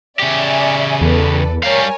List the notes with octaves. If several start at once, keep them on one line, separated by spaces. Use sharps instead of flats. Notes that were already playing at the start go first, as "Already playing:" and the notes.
C#3 G4 D5 E5 G#5
E2 A4 B4 D5
G3 A#4 C#5 F5 G#5